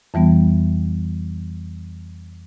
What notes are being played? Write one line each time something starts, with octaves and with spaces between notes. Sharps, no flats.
F2 E3 G3 B3